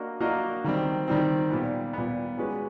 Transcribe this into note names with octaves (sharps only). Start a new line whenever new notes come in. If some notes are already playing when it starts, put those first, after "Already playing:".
Already playing: A#3 D4 F#4 A#4 D#5
A#3 D4 F#4 A#4 D#5
D#3 G3 C4
D#3 G3 C4
A#2 G3 B3
A#2 G3 B3
G#3 C#4 F#4 B4 D5